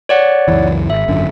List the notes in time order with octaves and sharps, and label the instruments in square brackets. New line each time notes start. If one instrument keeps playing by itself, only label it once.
[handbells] C#5 D5 F#5
[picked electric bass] C#2 F#2 E3
[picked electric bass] G#1 [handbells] E5
[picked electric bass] G#1 F#2 D3